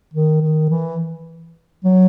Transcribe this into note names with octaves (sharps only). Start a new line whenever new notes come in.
D#3
D#3
E3
F#3